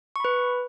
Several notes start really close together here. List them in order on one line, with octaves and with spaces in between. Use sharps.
C#6 B5 B4